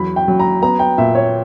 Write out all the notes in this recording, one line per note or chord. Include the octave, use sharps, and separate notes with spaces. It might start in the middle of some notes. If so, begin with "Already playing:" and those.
Already playing: E2 F#3 B5
G5
F#3
A#5
B3 A#5
G5
A#2 E5
C#5